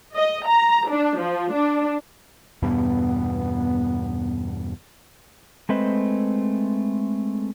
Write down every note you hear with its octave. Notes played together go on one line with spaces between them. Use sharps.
D#5
A#5
D4
F3
D4
E2 G2 B2 B3
G#3 A3 C4 B4 C5 D#5